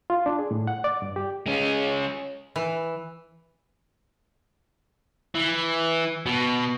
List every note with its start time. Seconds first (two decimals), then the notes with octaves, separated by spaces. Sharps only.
0.10 F4
0.26 D4
0.39 G#4
0.51 A2
0.67 F#5
0.84 D5
1.02 G2
1.16 G4
1.46 G#3 C#4
2.56 E3
5.35 E3
6.26 B2